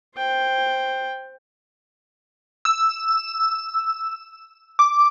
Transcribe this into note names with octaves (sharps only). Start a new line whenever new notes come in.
C5 G5
E6
D6